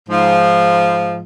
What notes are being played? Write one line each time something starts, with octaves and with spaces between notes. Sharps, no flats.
G#2 F3